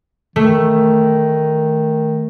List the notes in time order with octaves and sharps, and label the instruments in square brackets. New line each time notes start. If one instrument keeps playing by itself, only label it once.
[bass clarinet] D#3 [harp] A3